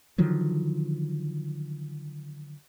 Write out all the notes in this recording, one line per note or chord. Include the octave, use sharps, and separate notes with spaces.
D3 D#3 F3 F#3